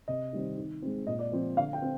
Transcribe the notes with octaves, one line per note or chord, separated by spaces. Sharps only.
C3 D#5
D#3 G3 C4
D#3
G#3 C4
A#2 D#5
D5
F3 C4
D3 F5
G5
C4